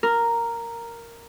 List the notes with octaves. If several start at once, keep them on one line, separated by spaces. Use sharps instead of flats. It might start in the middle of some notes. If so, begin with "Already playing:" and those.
A#4